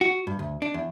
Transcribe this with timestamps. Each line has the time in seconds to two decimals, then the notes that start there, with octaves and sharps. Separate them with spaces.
0.01 F#4
0.27 G2
0.39 D2
0.62 D4
0.74 E2